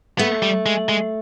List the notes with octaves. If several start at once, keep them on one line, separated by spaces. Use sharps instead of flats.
A3 B3
G3
G#3
G#3